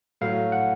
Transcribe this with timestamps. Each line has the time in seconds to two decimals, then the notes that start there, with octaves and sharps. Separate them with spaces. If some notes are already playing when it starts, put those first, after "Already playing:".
0.21 A2 F#3 A3 F5
0.52 F#5